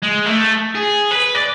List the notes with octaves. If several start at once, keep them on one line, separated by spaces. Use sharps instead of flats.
G#3
A3
G#4
B4
D5